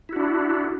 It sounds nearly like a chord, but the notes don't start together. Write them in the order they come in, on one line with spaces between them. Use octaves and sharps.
E4 F#4 D4